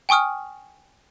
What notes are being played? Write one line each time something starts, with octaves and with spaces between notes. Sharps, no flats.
G5 G#5 C#6 D#6 F6